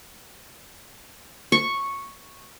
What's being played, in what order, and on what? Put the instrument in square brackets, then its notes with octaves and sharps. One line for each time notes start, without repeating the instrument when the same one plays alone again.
[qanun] C#6